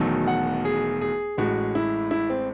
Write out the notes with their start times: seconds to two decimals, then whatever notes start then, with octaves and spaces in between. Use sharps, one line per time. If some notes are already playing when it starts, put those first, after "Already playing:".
Already playing: E1 E2 D#3 F#3 A3
0.28 F#5
0.65 G#4
1.01 G#4
1.38 A1 A2 G#3 F#4
1.75 E4
2.11 E4
2.30 C4